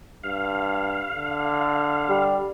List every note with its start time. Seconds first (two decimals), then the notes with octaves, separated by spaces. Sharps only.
0.23 G2 F5
1.11 D3
2.09 G3